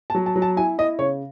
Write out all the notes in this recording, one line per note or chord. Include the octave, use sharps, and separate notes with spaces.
A5
F#3
A5
F#3
A5
E4 G#5
E4 D#5
C#3 C#5